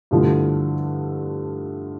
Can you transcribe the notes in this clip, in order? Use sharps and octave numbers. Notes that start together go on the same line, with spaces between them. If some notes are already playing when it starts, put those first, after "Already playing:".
G2 D3 F3 A3 E4